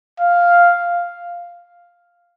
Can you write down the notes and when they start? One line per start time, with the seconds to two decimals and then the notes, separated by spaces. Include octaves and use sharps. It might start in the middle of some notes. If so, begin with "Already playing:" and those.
0.20 F5